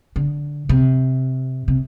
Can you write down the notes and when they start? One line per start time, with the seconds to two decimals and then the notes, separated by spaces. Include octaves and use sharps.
0.16 D3
0.69 C3
1.68 C3